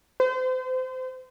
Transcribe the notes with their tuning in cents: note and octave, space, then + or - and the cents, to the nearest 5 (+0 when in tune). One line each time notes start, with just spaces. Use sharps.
C5 -35